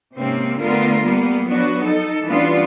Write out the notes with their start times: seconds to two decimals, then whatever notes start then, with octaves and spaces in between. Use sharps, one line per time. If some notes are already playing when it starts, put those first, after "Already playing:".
0.17 G#2 C3 A#3 C4 C#4
0.60 D3 A3 B3 F4 A#4
1.04 G3 A#3 B3
1.47 F3 F#3 B3 D4 F#4
1.82 D#4 A4
2.28 E3 G3 B3 C#4 D4 F4